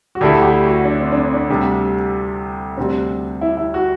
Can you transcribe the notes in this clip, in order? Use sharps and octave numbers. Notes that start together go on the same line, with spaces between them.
F#4
D2 D3 A3 E4 G4
G4
F#4
D4
C4
D4
C4
D4
D2 C3 G3
D2 C3 G3 C4
E4
E4
F#4